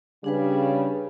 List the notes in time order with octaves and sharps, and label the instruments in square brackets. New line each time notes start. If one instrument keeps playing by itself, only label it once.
[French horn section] C#3 G3 [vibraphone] D4 G#4 B4